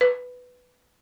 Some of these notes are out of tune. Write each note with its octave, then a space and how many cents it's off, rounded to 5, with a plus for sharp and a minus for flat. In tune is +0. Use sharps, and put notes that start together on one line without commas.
B4 +5